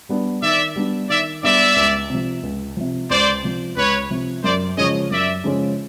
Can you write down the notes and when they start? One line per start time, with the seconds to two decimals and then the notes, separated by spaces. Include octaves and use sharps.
0.09 G3 B3 D4
0.42 D#3 D5 E5
0.76 G3 B3 D4
1.09 D#3 D5 E5
1.42 G3 B3 D4 D5 E5
1.76 C#2
2.10 C3 F3
2.43 C#2
2.77 C3 F3
3.10 C#2 C5 D5
3.43 C3 F3
3.77 C#2 B4 C#5
4.10 C3 F3
4.44 F#2 C5 D5
4.77 C#3 F3 G#3 C#4 C#5 D#5
5.11 F#2 D5 E5
5.44 C#3 F3 G#3 C#4